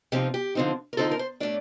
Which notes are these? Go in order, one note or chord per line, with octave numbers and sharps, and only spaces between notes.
C3 F3 C4 D#4 G4
G4
D3 F3 C4 D#4
A#4
D3 F3 C4 D#4 A4
A#4
C5
A2 A3 D4 D5